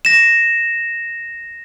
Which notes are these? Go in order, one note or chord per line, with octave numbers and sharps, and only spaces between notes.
A#6 E7